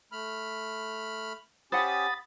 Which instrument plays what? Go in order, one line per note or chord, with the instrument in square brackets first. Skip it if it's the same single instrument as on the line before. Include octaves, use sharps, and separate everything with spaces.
[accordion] A3 B5 F6
[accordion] C#4 G4 [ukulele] C5 F#5 [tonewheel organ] B5 D#6 A6